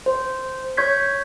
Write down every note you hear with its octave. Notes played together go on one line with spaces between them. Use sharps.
C5
C#5 C#6 G6 G#6 B6